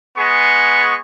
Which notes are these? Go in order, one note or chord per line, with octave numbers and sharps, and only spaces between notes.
G#3 B3 G#4 C#6